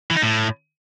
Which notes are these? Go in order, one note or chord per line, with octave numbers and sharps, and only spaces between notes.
E3
D#4
A2